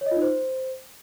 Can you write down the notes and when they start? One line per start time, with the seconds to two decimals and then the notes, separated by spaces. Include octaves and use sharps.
0.01 C#5
0.06 D#5
0.11 F4
0.17 D#4
0.22 C5